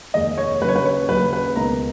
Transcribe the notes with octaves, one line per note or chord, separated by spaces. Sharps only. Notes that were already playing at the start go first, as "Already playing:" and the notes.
F1 D#2 D#3 G#3 D#5
C#5
D#2 C#3 F#3 C#4 B4
C#5
B4
C#5
D#2 C#3 F#3 C#4 B4
B4
C#2 B2 A#3 D#4 A#5